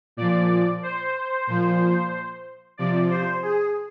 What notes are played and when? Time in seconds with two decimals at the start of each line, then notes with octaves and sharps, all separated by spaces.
0.17 A#2 F3 D5
0.83 C5
1.47 A#2 F3
2.77 C3 F3 D5
3.10 C5
3.43 G#4